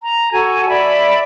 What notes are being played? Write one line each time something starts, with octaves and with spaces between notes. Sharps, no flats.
A#5
F#4 A4 G#5
D5 E5 B5